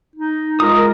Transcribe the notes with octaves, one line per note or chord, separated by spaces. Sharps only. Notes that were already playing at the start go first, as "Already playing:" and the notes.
D#4
G#3 F4 A#4 D#6